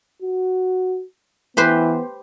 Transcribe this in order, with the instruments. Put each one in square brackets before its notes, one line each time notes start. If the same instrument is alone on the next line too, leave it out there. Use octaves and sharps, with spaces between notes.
[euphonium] F#4
[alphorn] E3 [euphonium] B3 [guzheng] G4 B4 C5